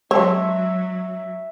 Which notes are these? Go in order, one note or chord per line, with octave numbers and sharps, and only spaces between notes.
F#3 G#3 C#5 E5 A5 C6